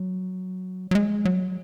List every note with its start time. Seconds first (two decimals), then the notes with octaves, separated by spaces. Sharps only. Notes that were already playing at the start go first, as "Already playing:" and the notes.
Already playing: F#3
0.91 F#3
0.95 G#3
1.25 F#3